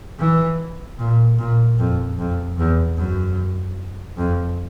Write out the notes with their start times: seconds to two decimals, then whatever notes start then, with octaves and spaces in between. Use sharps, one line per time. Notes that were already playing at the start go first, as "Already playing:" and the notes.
0.19 E3
0.99 A#2
1.38 A#2
1.79 F2
2.18 F2
2.58 E2
2.97 F#2
4.17 F2